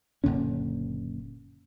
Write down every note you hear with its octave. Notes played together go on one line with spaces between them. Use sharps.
F#1 A#2 D3 C#4